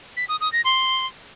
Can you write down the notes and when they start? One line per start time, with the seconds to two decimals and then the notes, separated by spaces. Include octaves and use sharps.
0.17 B6
0.29 D#6
0.41 D#6
0.53 A#6
0.65 C6